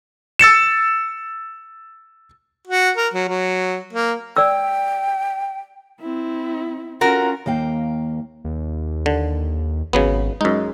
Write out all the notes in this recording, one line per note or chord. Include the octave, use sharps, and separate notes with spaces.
E6 A6 C#7 E7
F#4
A#4
F#3
F#3
A#3
D5 G5 E6
C4 E4
C#4 F4 F#4 A#4
D#2 A#3 F5 G5
D#2
D3
G#1 C#3 F#3 B3
F#2 G#3 D#4